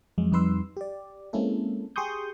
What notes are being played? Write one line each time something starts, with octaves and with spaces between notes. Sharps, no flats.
F2 F#3 G#3
F2 G3 D#4 B4 C6 E6
G4 D5
G#3 A#3 C4 C#4 E4 A4
G4 G#4 C6 C#6 D#6 G6